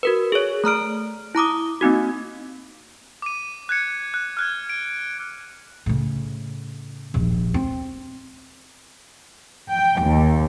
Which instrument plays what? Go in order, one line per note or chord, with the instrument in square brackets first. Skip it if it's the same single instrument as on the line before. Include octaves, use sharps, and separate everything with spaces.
[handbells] F#4 A#4 B4
G#4 C#5
A3 A#5 F6 D7
E4 A#5 D6 D#6
A#3 C4 D#4 F#4
[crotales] D6 D#7
F#6 G#6 C#7
F#6
F6 F#6 G#6
D7
[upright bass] A2 C#3
D#1 A#1
C4
[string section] G5
D#2